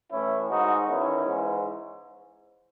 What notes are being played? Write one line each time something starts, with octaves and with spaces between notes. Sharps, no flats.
A2 E3 C#4 E4
G#2 D#3 D#4 F#4
E2 D#3 C#4 E4
G#2 E3